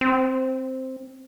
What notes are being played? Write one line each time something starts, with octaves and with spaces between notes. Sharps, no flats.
C4